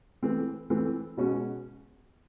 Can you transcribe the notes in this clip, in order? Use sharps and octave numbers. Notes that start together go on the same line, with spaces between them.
E3 A3 C4
E3 A3 C4
B2 G#3 C#4 F#4